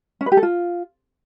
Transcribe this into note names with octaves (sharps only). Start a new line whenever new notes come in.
C#4
B4
G4
A4
F4